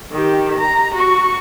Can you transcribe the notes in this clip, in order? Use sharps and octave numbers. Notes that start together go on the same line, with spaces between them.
D#3 G4
A#5
F#4 C#6